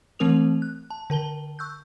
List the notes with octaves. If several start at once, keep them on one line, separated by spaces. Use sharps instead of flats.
E3 A3 C4 A#4 D#6 F7
F#6
A5
D3 A#4 A5 G7
C#6 E6 F#6 G6